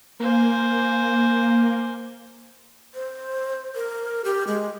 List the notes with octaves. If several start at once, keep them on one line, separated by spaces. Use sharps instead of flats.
A#3 C5 G#5
C5
A#4
G4
G#3